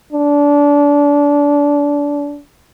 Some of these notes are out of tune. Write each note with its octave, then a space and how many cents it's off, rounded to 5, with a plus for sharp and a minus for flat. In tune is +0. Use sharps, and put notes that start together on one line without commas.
D4 -25